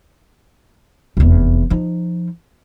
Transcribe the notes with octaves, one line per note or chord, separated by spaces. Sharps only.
F1 E2
F3 D#4